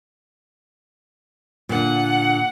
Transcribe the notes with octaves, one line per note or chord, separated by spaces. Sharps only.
A#2 D3 F#5